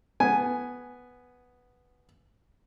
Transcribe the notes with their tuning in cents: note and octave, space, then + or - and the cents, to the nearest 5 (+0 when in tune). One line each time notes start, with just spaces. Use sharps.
B3 +0 G#5 +0